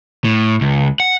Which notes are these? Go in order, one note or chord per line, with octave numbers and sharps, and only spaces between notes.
A2
C#2
F#5